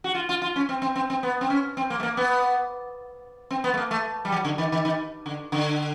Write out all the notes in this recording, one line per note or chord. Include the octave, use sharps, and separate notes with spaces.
F#4
F4
F4
F4
C#4
C4
C4
C4
C4
B3
C4
C#4
C4
A#3
A3
A#3
B3
C4
B3
A3
A#3
A3
G3
F#3
D3
D#3
D#3
D#3
D3
D3